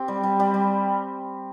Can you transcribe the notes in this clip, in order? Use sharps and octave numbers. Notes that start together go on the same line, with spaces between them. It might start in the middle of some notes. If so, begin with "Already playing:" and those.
Already playing: C4 G4
G3
G3
G3
G3